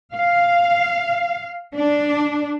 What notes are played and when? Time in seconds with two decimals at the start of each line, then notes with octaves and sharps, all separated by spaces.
0.13 F5
1.74 D4